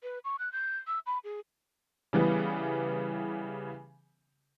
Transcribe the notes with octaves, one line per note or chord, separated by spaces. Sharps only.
B4
C#6
F#6
G6
E6
B5
G#4
C#3 E3 G3 B3